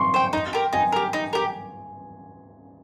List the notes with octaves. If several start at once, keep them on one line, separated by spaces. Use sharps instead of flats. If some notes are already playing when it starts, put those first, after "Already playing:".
Already playing: C6 C#6
C5 G5
D#4
G4 A#4
D#4 G#5
G4 A#4
D#4
G4 A#4